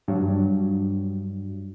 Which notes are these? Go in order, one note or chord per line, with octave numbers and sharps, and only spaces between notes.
G2 F#3